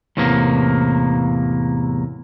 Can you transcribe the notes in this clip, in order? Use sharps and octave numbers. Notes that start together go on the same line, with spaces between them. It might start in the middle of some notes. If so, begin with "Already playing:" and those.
E2 A2 C3 E3 A#3